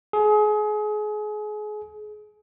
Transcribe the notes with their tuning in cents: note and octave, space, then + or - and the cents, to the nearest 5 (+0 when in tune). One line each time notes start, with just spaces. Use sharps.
G#4 +30